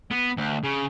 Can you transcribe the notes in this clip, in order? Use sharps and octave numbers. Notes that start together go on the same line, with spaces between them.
B3
D2
C#3